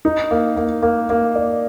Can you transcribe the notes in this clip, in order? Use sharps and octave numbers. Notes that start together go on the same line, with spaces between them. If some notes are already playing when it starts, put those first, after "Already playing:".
D#4
A#3
A#3
A#3
A#3
D5